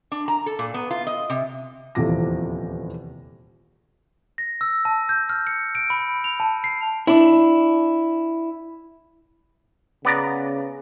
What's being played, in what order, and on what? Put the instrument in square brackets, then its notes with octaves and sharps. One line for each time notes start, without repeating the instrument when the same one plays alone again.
[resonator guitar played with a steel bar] D4
A#5
A4
A#2
B3
F4
D#5
C3
[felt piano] D#1 E2 C3 F3 D6 A#6
[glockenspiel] A#6
E6
A5
G6
F6
C#7
D7
B5
F7
A5
C7
[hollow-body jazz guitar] D4 E4
[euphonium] C#3 [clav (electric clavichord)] B3 D5 A#5